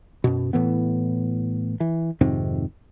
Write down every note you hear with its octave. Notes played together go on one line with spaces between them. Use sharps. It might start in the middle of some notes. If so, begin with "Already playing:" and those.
F#2 B2
A2 E3 B3
E3
F2 G#2 C3 D#3